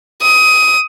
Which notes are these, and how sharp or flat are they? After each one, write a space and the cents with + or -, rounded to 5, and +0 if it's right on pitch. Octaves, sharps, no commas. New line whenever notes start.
D#6 +20